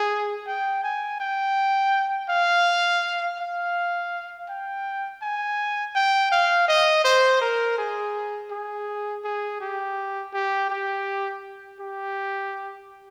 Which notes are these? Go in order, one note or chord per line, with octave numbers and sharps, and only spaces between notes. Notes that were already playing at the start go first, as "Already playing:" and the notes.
Already playing: G#4
G5
G#5
G5
F5
F5
G5
G#5
G5
F5
D#5
C5
A#4
G#4
G#4
G#4
G4
G4
G4
G4